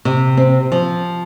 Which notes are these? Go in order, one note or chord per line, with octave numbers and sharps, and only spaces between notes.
C3
C4
F3